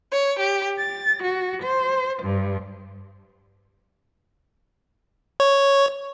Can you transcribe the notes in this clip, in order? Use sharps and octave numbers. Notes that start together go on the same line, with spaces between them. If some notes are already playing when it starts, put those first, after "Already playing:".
C#5
G4
A6
F#4
C5
G2
C#5